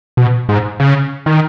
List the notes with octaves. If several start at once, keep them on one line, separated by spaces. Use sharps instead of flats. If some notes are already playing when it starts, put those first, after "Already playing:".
B2
G#2
C#3
D#3